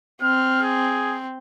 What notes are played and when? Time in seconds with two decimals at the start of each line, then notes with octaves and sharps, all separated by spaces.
0.22 C4 F6
0.62 G#4